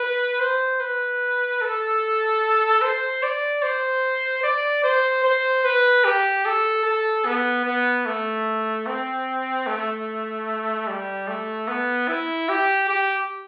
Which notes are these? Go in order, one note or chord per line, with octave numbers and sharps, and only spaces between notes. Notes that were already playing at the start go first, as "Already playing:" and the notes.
Already playing: B4
C5
B4
A4
C5
D5
C5
D5
C5
C5
B4
G4
A4
A4
B3
B3
A3
C4
A3
G3
A3
B3
E4
G4
G4